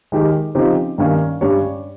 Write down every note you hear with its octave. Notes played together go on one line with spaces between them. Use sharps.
D#3 G#3 D#4 G4 A#4
C#3 F3 C4 D#4 G4
G2 D#3 A#3 C#4
G2 G3 C#4 G4 C#5